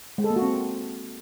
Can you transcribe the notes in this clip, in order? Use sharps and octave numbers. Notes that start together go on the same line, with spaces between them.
G#3
A4
A#3
F#4
C4